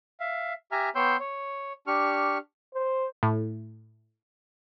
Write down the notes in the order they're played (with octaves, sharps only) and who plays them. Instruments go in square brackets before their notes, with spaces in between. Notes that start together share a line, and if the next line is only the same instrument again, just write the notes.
[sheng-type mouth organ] E5 F5
G4 E5 G#5 A#5 F6
B3 C#5 G5 C6 E6 G6
C#5
D4 G4 C#6 F6
[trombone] C5
[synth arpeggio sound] A2